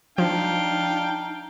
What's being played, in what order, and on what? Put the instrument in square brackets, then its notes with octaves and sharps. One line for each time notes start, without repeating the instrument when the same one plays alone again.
[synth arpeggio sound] F3 [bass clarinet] D4 [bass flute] D#4 [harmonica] F5 G5